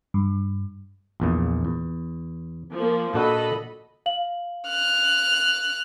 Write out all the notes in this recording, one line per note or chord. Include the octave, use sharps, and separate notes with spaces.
G2
A#1 E2 A#2
E2
F3 A#3
A#2 D4 F#4 A4 D#5 B5
F5 F#7
F6 F#6